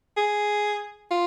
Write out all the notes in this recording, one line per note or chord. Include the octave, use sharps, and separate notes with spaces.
G#4
F4